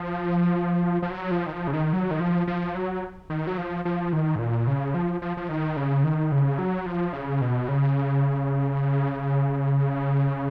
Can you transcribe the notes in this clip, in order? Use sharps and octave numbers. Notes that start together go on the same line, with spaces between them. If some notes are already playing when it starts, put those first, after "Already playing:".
Already playing: F3
F3
F#3
F3
D#3
F3
C#3
D#3
F#3
D#3
F3
F3
F#3
D#3
F#3
F3
F3
D#3
G#2
A#2
C#3
F3
F3
F3
D#3
C#3
D#3
C#3
F#3
F3
C#3
B2
C#3